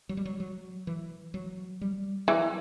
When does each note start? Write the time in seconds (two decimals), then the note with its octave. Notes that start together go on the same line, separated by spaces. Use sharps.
0.09 F#3
0.17 G3
0.25 F#3
0.40 F#3
0.87 E3
1.34 F#3
1.81 G3
2.27 E3 F#3